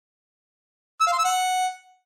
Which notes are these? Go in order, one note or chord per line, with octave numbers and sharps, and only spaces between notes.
E6
F5
C6
E6
F#5